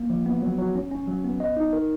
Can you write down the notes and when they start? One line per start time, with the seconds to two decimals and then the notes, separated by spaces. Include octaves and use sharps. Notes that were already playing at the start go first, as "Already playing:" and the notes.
Already playing: A#3
0.10 F3
0.26 B3
0.42 F#3
0.59 F#3
0.75 C#4
0.91 C#4
1.07 F#3
1.24 B3
1.40 D#5
1.57 D#4
1.73 A#4